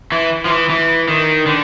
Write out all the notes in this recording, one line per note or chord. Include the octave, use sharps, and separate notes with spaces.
E3
F3
E3
E3
D#3
D3